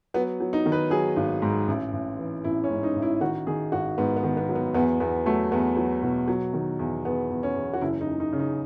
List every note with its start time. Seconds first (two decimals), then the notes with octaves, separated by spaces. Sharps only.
0.14 F#3 B3
0.40 F#3
0.53 D#4
0.66 D#3
0.72 B4
0.91 F#3 G#4
1.16 G#1
1.42 G#2
1.68 A1
1.93 A1
2.19 E3
2.44 A1 E4
2.64 C#4
2.70 G#2
2.83 D#4
2.96 A1
3.02 E4
3.21 D#3 F#4
3.47 D#3 G#4
3.72 G#1 F#4
3.98 G#2 B3
4.16 B3
4.23 D#3
4.37 B3
4.49 F#3
4.55 B3
4.74 E2 B3
5.00 E2 B3
5.26 F#3 A3
5.52 E2 B3
5.77 F#3
6.03 B2
6.28 F#3
6.53 D#3
6.79 E2
7.05 E2 B3
7.30 E2
7.43 C#4
7.55 E2
7.73 F#4
7.81 F#1 E4
8.01 D#4
8.06 F#1
8.20 D#4
8.32 C#3
8.39 D#4